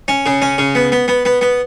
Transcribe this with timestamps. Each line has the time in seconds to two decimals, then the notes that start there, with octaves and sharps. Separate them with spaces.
0.08 C#4
0.26 C#3
0.42 C#4
0.58 C#3
0.75 B3
0.92 B3
1.08 B3
1.25 B3
1.41 B3